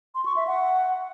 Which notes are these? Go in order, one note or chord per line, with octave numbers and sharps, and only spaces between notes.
C6
C#6
E5
F#5